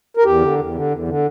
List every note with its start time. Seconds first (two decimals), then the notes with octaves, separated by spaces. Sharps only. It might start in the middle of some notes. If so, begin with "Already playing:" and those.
0.17 A#4
0.24 E2 G4
0.42 D3
0.58 E2
0.74 D3
0.91 E2
1.08 D3